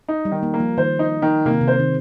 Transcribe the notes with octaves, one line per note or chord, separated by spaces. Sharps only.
D#4
G3
D#3
A#3
A#3
F3
D#3 C5
D#4
D#3
C3 A#3
D#3
C3
C5
D#3